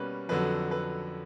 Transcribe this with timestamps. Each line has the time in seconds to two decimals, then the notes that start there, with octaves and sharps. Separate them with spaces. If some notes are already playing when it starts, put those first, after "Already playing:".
Already playing: B2 G3 A#3 C#4 B4
0.29 F2 D3 F#3 B4
0.71 B4